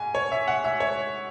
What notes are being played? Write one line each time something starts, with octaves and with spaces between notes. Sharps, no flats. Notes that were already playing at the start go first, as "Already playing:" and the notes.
Already playing: G#2 G#5
C#5
E5
F#5
E5
C#5